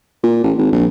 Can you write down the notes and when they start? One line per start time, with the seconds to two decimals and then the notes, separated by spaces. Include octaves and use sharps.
0.23 A#2
0.44 A1
0.58 G#1
0.73 A#1